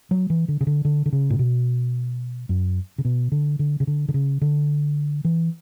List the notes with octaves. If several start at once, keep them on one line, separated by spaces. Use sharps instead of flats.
F#3
E3
D3
C#3
D3
D3
D3
C#3
A2
B2
F#2
C#3
B2
D3
D3
C#3
D3
D3
C#3
D3
E3